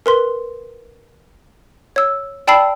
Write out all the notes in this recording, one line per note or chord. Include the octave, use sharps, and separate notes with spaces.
A#4 B4 C6
C#5 E6
D5 G5 A5 B5 E6 C7